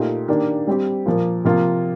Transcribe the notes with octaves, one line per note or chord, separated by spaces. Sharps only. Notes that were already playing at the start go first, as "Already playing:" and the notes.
Already playing: A#2 A3 D#4 G4
D#3 A#3 D4 G4
G3 C4 G4
A#2 F3 A#3
C3 F3 A#3 F4